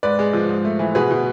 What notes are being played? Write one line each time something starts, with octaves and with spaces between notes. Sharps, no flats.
G#2 B4 D5
G#3
F3
G#2
A3
E3
B2 G#4 B4
B2